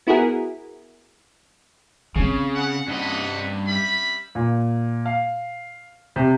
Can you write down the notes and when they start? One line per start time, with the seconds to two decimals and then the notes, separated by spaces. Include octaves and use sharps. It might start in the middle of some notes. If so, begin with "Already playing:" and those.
0.07 B3 E4 F#4 G#4 A#4
2.16 C#3 C4 C#4
2.55 F#5
2.87 G2 D4 B4 D#5 F#5
3.68 G3 E5 B5
4.35 A#2
5.06 F5
6.16 C3